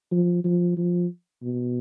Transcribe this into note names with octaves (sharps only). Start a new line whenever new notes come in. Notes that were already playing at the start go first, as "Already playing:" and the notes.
F3
F3
F3
B2